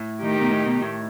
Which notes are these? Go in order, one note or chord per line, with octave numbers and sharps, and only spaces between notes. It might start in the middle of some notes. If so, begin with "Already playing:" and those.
Already playing: A2
D#3 A3 D#4 G4
B2
A2
B2
A2